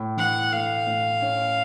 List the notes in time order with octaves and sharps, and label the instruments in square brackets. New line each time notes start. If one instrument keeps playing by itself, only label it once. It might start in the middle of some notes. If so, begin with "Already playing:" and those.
Already playing: [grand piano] A2
[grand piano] E3 [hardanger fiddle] F#5
[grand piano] A3 [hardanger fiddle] F5
[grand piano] A2
C#4